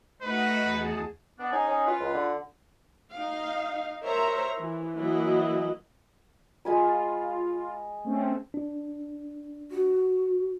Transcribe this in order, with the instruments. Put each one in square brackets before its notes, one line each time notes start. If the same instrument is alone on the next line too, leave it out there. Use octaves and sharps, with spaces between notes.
[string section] A3 D#4 F#4 [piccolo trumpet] B4
[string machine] E2 G#4 A5
[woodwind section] B3 D4
[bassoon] C#4 [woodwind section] D#4 G#4
[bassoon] C#4
[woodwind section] F4 B4
[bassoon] C#2
D3
[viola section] D#4 F5
A#4 C5 C#5 E5 A#5
E3
E3 F#3 A#3 E4 D#5
[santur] G#3 G#5 B5 [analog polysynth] F4
[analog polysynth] A3 C4 C#4
[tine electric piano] D4
[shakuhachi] F#4